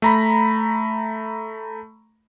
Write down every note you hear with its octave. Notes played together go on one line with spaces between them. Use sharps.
A3 A#5 B5